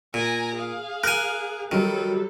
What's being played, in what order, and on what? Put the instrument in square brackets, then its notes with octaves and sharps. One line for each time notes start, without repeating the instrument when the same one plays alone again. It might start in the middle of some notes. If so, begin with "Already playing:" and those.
[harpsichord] A#2 [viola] G#5 A#5
[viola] G#4 F5
[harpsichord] A#4 G#5 [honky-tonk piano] F#6
[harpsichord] D#3 [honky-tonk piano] F#3 G3 [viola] A4